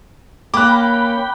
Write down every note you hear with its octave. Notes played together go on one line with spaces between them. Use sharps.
A#3 C#4 G5 B5 D6 F#6